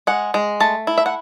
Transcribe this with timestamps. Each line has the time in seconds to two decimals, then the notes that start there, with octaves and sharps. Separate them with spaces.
0.07 G#3 F#5
0.34 G#3
0.60 A3 A5
0.87 E4
0.98 E5
1.06 F#5